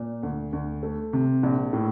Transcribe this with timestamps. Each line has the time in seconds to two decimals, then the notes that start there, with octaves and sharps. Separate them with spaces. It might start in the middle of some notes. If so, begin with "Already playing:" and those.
Already playing: A#2
0.23 D2
0.53 D2
0.83 A3
1.13 C3
1.43 A#1
1.73 A2